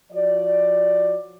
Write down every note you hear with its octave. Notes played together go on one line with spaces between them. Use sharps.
F3 F#4 C#5 D5